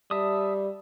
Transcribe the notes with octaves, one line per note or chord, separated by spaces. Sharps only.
G3 E5 A5 D#6